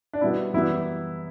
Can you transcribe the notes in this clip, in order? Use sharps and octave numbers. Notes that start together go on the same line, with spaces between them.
D4
B2 G3 B3 E4
F#2 E3 G3 B3 E4